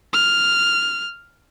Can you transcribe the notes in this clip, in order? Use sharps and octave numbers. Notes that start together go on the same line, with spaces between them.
F6